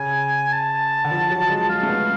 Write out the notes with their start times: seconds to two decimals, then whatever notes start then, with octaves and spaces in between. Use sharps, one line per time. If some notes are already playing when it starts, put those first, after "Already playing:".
Already playing: C#3 G#5
0.52 A5
1.04 D3
1.11 F3
1.30 F#3
1.50 G#3
1.69 G#3 F5
1.83 A3
1.89 B3